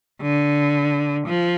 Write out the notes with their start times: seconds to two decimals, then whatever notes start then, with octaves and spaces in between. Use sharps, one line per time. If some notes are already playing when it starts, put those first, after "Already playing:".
0.22 D3
1.27 F3